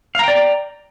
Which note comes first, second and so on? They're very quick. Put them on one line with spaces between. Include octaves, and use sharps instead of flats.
F5 A#5 G5 D5